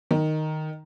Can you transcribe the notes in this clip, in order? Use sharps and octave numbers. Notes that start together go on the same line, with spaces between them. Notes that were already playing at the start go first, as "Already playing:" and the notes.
D#3